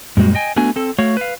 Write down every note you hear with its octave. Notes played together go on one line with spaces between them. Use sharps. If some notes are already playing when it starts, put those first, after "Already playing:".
F#2 A#2 G3 G#3 F#4
D#5 G5 G#5
A3 B3 D4 F#4 G#5
C4 A4
A3 F#4 C#5 F5
B4 F5